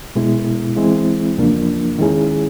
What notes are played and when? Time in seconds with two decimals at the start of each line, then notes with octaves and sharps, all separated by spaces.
0.15 B2 G#3 B3 E4
0.76 E3 G#3 C4 E4
1.38 E2 C#3 F3 A#3 D4
1.99 D#3 G#3 C#4 E4 G#4